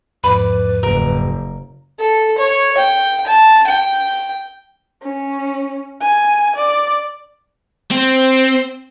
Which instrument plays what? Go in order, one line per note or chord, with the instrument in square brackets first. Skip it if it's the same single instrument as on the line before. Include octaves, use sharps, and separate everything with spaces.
[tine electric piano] E2 G#2 F3 [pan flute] B4 [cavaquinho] D5 B5
[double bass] F#1 [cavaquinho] A#4
[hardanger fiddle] A4
C#5
G5
A5
G5
[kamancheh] C#4
G#5
D5
[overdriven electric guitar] C4